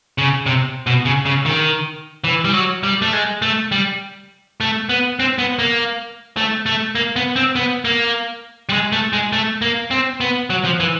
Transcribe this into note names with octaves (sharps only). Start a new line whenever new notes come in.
C#3
C3
B2
C#3
C#3
D#3
E3
G3
F#3
G3
A3
G#3
A3
G3
A3
B3
C4
B3
A#3
A3
A3
A#3
B3
C4
B3
A#3
G3
G#3
A3
G#3
A3
A#3
C4
B3
F#3
F3
E3